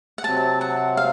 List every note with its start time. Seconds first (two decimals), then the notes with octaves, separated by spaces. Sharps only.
0.18 F#5
0.24 C3 F#3 C4 A5
0.61 F#5
0.97 F5